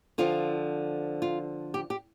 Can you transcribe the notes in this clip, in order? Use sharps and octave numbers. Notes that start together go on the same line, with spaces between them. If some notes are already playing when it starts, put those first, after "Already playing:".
D3 F3 C4 F4
F4
G4
G4